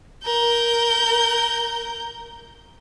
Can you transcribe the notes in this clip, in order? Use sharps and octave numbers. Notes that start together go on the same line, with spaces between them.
A#4 G6